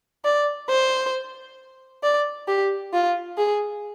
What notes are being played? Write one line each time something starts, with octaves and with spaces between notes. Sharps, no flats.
D5
C5
D5
G4
F4
G#4